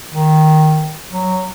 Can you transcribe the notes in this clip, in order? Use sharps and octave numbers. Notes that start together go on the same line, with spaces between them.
D#3
F#3